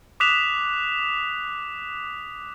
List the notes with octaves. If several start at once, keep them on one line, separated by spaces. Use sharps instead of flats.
D6 D#6 F#6 B6 E7 F7